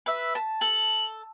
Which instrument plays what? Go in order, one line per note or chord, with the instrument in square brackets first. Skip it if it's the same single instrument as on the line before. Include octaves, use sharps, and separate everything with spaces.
[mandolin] B4 E5
A5
[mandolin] A4 [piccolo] F#7